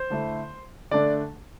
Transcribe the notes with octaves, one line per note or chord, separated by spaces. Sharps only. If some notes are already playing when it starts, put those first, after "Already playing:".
Already playing: C5
D3 A3 E4
D3 A3 D4 D5